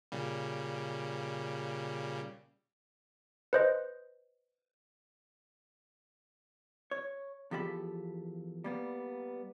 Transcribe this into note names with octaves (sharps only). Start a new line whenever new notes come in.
A#2 C#3 G3
B4 C5 D#5
C#5
E2 F3 G4 A4 D#5 B5
G3 A#3 B3